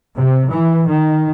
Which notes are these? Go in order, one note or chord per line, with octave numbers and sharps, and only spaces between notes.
C3
E3
D#3